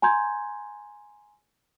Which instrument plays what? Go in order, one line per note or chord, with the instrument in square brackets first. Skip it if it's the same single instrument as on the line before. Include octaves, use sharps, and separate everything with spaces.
[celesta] G#5 A#5 C6 G6 G#6